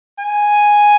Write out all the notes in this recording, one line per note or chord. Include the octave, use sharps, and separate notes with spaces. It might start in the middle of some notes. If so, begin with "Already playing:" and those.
G#5